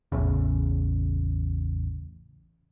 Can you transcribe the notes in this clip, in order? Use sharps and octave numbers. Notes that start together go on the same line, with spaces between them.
A1 E2 A2 C#3